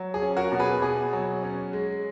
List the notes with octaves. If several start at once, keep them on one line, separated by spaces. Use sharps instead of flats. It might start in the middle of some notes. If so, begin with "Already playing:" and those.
Already playing: F#3
G#4
C#4
F#4 A#4
B2
G#4 B4
B2 G#4
F#3
C#4
G#3